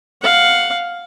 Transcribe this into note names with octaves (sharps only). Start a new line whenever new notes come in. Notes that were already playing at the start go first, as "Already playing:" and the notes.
F5 F#5